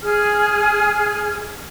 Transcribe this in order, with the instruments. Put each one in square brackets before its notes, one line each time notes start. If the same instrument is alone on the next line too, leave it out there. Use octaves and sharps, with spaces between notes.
[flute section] G#4 F6